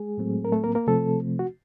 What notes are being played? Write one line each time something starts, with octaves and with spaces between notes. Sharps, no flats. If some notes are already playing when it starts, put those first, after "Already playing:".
Already playing: G#3 G#4
A2 F#3 A3 C4
A#4
A3 A4
A#3 A#4
A#3 A#4
C3 F3 A3 C4 A4
F#4